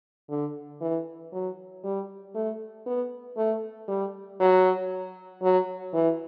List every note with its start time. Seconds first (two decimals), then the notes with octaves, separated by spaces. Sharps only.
0.30 D3
0.81 E3
1.33 F#3
1.84 G3
2.35 A3
2.86 B3
3.37 A3
3.88 G3
4.40 F#3
5.42 F#3
5.93 E3